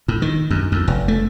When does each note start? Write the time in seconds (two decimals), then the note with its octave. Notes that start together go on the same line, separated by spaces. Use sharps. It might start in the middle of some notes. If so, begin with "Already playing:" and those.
0.08 A2
0.22 D#3
0.51 F#2
0.72 F2
0.88 F1
1.08 A3